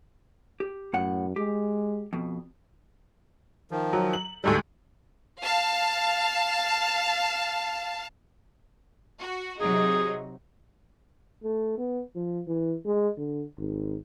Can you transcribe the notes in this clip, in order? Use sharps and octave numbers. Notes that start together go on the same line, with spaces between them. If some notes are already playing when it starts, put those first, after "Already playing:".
G4
F#2 A2 F#5
G#3 G4
F2 B2
D#3 F3
F#3
F#7
D2 G#2 G3 A4
F5 A5
F#4
C3 F#3 D#4 G#4
A3
B3
F3
E3
G#3
D3
G#1